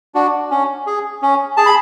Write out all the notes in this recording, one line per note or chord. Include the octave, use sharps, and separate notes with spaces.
D4 F#4
C#4
G#4
C#4
G#4 A5
B5